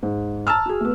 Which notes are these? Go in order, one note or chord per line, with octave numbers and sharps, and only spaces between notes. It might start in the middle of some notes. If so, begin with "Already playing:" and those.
G#2
A5 A#5 E6 F6
F#4 G#4
A3 B3